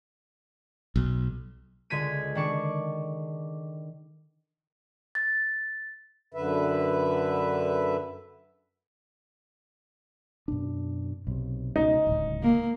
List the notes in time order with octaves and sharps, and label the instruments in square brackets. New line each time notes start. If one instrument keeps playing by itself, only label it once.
[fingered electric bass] B1
[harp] C#2 D3 G#6 B6 D#7
D#3 D4 C#6 D6
[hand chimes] A6
[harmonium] F#2 D3 B4 E5
[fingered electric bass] F#2 B2 D4
B1 C3
[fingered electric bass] C#2 B2 [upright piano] D#4
[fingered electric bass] D1 C#2
[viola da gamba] A#3